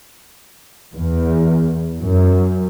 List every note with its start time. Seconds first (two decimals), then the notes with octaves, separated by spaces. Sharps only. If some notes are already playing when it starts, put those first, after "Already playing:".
0.95 E2
2.00 F#2